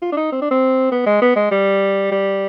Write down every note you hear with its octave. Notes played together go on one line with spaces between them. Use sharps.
F4
D4
D#4
C4
D4
C4
B3
G#3
B3
G#3
G3
G3